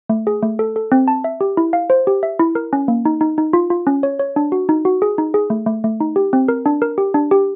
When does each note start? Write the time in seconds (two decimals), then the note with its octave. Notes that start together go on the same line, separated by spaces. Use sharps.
0.10 A3
0.27 G#4
0.42 A3
0.59 A4
0.76 A4
0.92 C4
1.08 A5
1.24 E5
1.41 G4
1.57 E4
1.73 F5
1.90 C5
2.07 G4
2.23 E5
2.39 E4
2.55 A#4
2.73 C#4
2.88 A#3
3.05 D#4
3.21 D#4
3.38 D#4
3.53 F4
3.70 F4
3.87 C#4
4.03 C#5
4.19 C#5
4.36 D4
4.52 F#4
4.69 D#4
4.85 F#4
5.02 G#4
5.18 D#4
5.34 G#4
5.50 A3
5.67 A3
5.84 A3
6.00 D#4
6.16 G4
6.33 C4
6.48 A#4
6.66 D4
6.82 A#4
6.98 G4
7.14 D4
7.31 G4